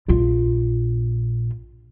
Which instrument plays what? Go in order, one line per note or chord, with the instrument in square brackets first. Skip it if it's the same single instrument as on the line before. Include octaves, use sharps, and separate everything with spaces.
[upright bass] A#1 F4